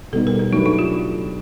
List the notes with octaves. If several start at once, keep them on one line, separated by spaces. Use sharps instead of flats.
B2 G3 B3 D#4 A4
A#4
A4
F#3 A3 D4 D#4 G4 B4
D#4
F4